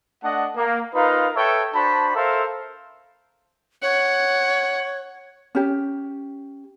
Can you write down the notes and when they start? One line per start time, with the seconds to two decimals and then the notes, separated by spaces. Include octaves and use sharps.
0.23 A3 D4 D#5 F#5
0.56 A#3
0.95 D#4 F4 A#4 B4 F5
1.35 A4 B4 C#5 E5 G5
1.75 D4 F#4 C5 A5 B5
2.15 A4 A#4 C5 E5 F5
3.82 C#5 F#5
5.55 C#4 G4